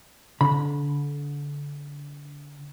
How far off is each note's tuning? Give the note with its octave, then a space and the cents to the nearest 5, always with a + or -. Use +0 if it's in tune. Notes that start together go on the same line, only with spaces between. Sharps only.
D3 -25 B5 -10